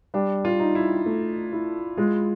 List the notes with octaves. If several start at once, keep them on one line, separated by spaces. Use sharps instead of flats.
G3 D4
F4
D#4
E4
A3
E4
G#3 F4